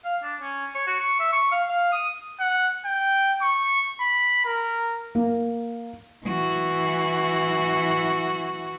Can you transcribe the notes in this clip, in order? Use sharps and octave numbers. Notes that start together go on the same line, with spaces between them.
F5
D4
C#4
C#5
F#4
C#6
E5
C#6
F5
F5
D#6
F#5
G5
C#6
B5
A#4
A#3
E3 F#4